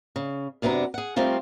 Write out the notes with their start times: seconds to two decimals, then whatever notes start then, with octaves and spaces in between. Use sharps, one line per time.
0.16 C#3
0.62 F#2 C3 B3 D4 A#5
0.94 G#4 F#5
1.16 G3 A3 C4 D#4 F4 A#4